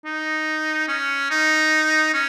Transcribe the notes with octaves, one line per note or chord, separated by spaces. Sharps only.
D#4
C#4
D#4
C#4